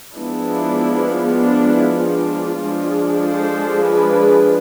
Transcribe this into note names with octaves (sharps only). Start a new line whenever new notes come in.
F3 G#3 B3 D4 E4
D4
E4
D4 F4
F3 G#3 D4
A4 C5
G#4 B4